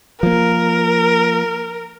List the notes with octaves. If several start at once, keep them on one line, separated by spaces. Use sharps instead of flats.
F3 A#3 A#4